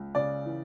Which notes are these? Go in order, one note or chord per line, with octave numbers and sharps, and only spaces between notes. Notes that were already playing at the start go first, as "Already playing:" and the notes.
Already playing: C#2
C#3 D5
E3